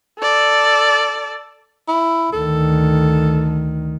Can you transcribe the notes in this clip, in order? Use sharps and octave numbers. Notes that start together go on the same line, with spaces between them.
A4 D5
E4
D2 D#3 A4